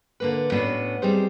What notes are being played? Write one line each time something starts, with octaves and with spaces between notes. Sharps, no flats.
D3 A#3 B4
A2 B3 C#4 D4 F#4
G3 C4 D#4 G#4 C5